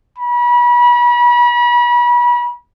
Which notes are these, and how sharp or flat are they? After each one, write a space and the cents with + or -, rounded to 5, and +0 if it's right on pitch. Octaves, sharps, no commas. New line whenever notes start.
B5 -35